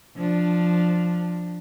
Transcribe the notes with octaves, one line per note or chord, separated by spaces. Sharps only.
F3 D4